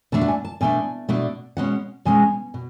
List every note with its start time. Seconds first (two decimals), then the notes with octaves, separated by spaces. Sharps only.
0.12 B2 A3 D4 A5
0.21 F#5
0.28 G#5
0.45 A5
0.61 B2 A3 D4 G#5
1.09 B2 A3 D4
1.57 B2 G#3 C#4 F#5
2.05 B2 G#3 C#4 G#5
2.54 B2